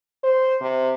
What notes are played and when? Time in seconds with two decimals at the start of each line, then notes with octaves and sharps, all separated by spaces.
0.24 C5
0.61 C3